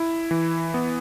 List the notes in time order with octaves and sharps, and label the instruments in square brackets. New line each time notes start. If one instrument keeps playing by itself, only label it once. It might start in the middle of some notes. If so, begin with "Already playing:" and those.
Already playing: [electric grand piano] E4
E3
B3